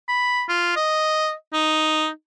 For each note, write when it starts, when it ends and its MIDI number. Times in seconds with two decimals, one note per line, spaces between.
0.09 0.43 83
0.49 0.74 65
0.76 1.33 75
1.53 2.09 63